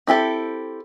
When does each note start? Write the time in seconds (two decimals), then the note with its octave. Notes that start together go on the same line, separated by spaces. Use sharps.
0.07 C4 E4 G4 A4